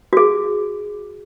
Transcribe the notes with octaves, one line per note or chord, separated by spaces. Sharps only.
F#4 G#4